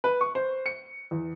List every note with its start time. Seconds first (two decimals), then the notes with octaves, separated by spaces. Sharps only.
0.04 B4
0.21 C#6
0.35 C5
0.66 C#7
1.11 E2